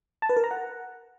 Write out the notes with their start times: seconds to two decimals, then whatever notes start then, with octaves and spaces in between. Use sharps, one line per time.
0.22 A5
0.29 B4
0.37 A#4
0.44 A#5
0.51 F#5